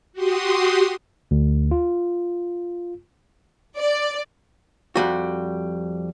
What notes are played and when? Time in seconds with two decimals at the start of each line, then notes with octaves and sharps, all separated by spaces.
0.13 F#4 G4 C6 D#6
1.31 D2
1.71 F4
3.78 D5
4.96 F2 G3 F#4